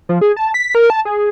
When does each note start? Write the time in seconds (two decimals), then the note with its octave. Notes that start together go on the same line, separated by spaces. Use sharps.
0.09 F3
0.21 G#4
0.36 A5
0.54 B6
0.75 A#4
0.90 A5
1.05 G#4